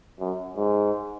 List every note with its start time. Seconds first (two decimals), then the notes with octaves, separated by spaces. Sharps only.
0.20 F#2
0.57 G#2